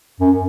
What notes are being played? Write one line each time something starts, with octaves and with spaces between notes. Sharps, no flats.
F#2